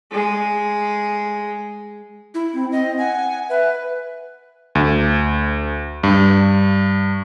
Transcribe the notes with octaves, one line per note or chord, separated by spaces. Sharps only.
G#3 G#4
E4
C4
C4 D#5
F#5 G#5
B4 E5
D2
G2